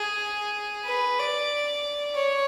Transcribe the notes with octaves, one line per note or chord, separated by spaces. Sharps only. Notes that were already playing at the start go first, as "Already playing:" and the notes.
Already playing: G#4
B4
D5
C#5